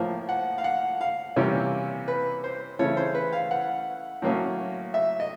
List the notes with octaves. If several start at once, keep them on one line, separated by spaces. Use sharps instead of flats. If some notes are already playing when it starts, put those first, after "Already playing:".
Already playing: A2 F3 A#3
F#5
F5
F#5
F5
C3 E3 G3 A#3 C#4
B4
C5
C#3 E3 A3 C#5
C5
B4
F5
F#5
A2 F#3 A#3 C#4
E5
D#5